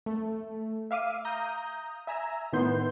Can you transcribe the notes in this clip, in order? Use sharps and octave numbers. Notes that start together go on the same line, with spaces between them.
A3
E5 F5 D6 D#7
A#5 D#6 G6
E5 G#5 A#5 E6
A2 D#3 B3 C6 G6